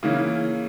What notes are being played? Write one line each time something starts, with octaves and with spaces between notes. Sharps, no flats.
C#3 E3 A#3 C#4